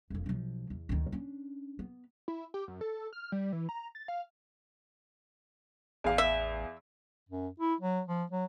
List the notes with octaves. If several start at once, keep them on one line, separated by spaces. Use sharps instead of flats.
E1 F2
B1 F3
E2
D2 D#3
C#4 D4
B3
E4
G4
F#2
A4
F6
G3
E3
A#5
A6
F5
A1 E2 F5
E5
F#2
E4
F#3
F3
F#3